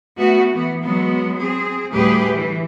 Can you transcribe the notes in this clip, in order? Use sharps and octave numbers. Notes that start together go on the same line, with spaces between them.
A3 B3 F#4
E3 B3
F#3 G#3 B3
C4 G#4
D2 A2 G3 G4 G#4 B4
E3